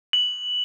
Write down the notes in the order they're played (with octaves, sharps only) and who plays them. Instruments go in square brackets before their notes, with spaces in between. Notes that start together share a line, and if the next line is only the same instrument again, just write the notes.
[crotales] F#7